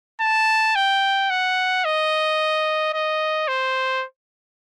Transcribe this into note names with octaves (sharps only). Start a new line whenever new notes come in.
A5
G5
F#5
D#5
D#5
C5